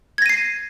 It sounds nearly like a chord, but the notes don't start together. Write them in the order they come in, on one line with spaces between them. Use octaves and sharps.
G#6 A#6 D#7 C7